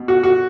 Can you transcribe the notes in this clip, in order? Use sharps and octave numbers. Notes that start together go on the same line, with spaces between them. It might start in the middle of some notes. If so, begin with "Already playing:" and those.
Already playing: B2
F#4
F#4